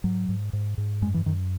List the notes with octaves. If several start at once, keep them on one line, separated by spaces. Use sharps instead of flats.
G#2 F#3
G#2
G#2
G#2
F#2 G#3
E3
F#2 D#3